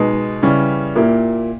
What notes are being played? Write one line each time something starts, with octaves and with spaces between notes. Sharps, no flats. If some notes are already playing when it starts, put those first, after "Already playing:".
Already playing: B2 G#3 D#4
C#3 E3 G3 C#4
A#2 A#3 E4 G4